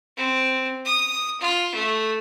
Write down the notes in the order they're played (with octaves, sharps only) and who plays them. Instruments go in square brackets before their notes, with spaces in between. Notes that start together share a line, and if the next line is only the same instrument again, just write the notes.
[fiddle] C4
D#6
F4
A3